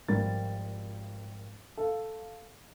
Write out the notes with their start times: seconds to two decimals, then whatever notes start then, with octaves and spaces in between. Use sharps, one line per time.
0.08 G#1 F3 G3 G4 A#4 A6
1.77 A4 F5